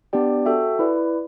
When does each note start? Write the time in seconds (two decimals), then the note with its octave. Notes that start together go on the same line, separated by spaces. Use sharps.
0.13 B3 D4 G4 D5 G5
0.46 F#4 A4 E5 G5
0.79 E4 B4 D5